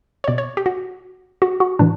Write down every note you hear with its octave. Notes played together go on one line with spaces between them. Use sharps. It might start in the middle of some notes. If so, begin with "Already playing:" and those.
C#5
B2 D5
C#5
G4
F#4
F#4
F#4
A2 E3 D4